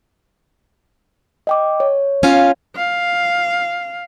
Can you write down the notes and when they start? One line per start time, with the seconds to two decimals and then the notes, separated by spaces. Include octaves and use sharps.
1.47 D#5 G5 D6
1.80 C#5
2.23 C#4 F4 F5
2.76 F5